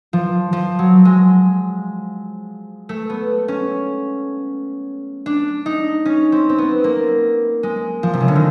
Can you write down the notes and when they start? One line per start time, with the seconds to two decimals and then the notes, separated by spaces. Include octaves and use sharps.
0.13 F3
0.53 F3
0.79 F#3
1.05 G#3
2.89 A3
3.10 B3
3.48 C#4
5.26 D4
5.66 D#4
6.05 C#4
6.32 C4
6.49 C4
6.58 B3
6.84 A#3
7.63 G#3
8.03 F3
8.13 C3
8.21 C#3
8.28 D3
8.36 D#3